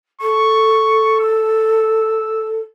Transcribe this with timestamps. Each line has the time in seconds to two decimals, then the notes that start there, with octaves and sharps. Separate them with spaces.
0.21 A4 C#6
1.20 E6